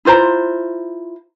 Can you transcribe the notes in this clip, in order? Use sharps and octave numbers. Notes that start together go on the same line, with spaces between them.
E4 F4 C5 A#5